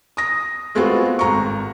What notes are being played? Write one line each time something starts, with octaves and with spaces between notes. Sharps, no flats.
D#6 A#6
G#3 A3 B3 C4 F4 F#4
G#1 A#5 C#6